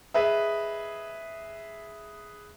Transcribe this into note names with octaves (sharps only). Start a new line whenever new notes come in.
G#4 B4 D#5 E5